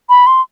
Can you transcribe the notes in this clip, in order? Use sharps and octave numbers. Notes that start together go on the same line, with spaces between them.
B5
C6